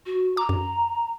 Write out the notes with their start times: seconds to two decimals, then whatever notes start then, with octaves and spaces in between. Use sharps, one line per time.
0.06 F#4
0.37 A#5 D6
0.49 F#2